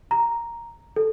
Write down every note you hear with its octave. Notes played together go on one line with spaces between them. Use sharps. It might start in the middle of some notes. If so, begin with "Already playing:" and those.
A#5
A4